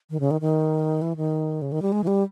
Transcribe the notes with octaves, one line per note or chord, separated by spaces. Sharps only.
D#3
C#3
D#3
D#3
E3
D#3
C#3
D#3
G3
G#3
E3
G3